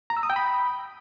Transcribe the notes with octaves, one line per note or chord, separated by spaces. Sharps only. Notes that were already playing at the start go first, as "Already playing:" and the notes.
A#5
E6
D#6
G5
B5